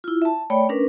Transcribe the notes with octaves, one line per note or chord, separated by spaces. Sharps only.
E4 F4
E5 A5
A3 C#5 D5 G5 B5
C#4 D4 A#4 B4